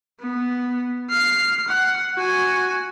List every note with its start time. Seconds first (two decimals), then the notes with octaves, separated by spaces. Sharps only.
0.20 B3
1.10 F6 C7
1.68 F#5
2.16 F#4 G#5